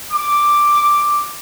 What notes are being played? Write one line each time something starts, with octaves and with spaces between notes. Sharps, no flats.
D6